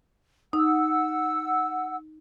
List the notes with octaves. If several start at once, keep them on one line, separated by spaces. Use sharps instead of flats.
D#4 F#5 E6